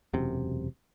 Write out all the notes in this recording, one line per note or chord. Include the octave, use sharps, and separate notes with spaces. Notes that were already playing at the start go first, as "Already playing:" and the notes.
E1 F#2 C3